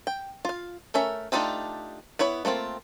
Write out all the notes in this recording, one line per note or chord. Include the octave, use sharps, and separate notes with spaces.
G5
F4 F5
A3 C#4 A#4 E5
A3 D4 D#4 F4 G4
B3 E4 C#5 B5
A3 A#3 C4 F4